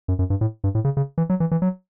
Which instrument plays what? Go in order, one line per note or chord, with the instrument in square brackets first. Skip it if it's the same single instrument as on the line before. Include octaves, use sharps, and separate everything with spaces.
[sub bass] F#2
F#2
G2
A2
G2
A2
C#3
C#3
E3
F#3
E3
E3
F#3